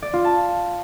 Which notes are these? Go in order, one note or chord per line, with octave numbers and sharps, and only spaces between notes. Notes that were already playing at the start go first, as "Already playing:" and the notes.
D5
F4
A5